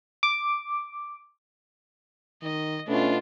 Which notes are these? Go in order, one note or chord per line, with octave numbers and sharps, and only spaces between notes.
D6
D#3 D#5
B2 A3 B3 C#4 D4 F4